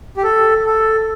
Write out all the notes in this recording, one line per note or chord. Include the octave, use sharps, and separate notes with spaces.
G4
A4
A4